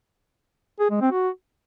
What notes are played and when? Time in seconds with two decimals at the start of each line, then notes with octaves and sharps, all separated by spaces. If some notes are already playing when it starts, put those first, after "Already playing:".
0.80 G#4
0.90 G#3
1.01 C4
1.12 F#4